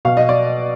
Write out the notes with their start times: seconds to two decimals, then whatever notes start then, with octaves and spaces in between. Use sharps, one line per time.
0.05 B2 F5
0.17 D#5
0.29 D5